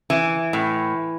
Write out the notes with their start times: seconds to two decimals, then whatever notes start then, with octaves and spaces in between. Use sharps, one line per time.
0.10 E3
0.53 A2